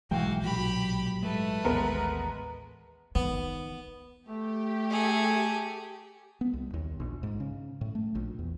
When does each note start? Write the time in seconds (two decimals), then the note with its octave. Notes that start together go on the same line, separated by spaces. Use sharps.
0.11 B1 G#2 E3 G#3 F#4 F5 G5
0.42 A#1 A#2 F#3 G4 B5
1.23 G#2 G#3 A3 B4
1.64 A1 D#2 G#3 B3 A#4
3.15 D#3 B3
4.29 A3 G4
4.90 G#4 A4
6.41 B3
6.54 C2
6.74 D#2
7.00 A#1
7.23 G#2
7.40 C#3
7.81 A2
7.95 A3
8.15 A#1
8.39 E2